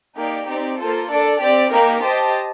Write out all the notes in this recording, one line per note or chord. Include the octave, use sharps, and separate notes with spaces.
A#3 D#4 G4 D5
C4 D#4 G4 D5
A#3 F4 A4 C5
D4 A4 D5
C4 G4 D5
A#3 D#4 G4 A#4
G4 C5 D#5 A5